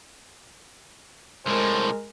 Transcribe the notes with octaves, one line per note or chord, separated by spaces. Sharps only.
C2 A2 G#3 A#4 C5